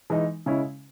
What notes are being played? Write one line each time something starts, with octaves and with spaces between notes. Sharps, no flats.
E3 G#3 D#4
C#3 G#3 C#4 E4